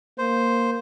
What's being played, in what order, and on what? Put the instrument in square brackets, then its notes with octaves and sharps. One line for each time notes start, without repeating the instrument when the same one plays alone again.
[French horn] A#3 [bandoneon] C5